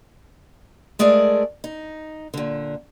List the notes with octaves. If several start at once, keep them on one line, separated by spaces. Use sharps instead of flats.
G#3 A3 G#4 A#4 D5
D#4
A#2 D3